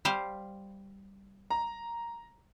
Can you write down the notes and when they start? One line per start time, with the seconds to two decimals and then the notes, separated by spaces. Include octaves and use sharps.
0.05 G3 C5 F5
1.50 A#5